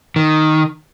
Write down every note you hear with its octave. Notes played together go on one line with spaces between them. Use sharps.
D#3